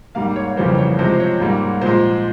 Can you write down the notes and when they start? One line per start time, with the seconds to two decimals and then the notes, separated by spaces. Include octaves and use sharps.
0.15 G#2 G3 A#3 F5
0.36 C#5
0.56 F2 C#3 E3 G3 A#3 C5
0.78 C#5
0.98 C3 F3 G#3 C5
1.20 C#5
1.40 G#2 G3 A#3
1.81 A#2 F3 G#3 C5